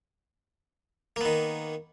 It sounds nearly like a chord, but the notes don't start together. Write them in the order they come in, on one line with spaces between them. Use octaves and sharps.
A#3 B3 D#3